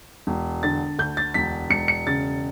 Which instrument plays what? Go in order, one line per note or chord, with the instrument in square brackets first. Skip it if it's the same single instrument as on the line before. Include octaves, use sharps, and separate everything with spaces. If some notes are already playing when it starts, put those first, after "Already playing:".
[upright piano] E1
D3 A6
D2 G6
A6
E1 B6
E1 C#7
C#7
C#3 A6